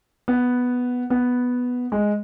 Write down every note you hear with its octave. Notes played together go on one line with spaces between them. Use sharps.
B3
B3
G#3